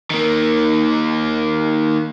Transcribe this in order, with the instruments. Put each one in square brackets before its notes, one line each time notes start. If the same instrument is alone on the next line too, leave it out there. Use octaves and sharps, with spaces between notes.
[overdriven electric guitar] D#3 A#3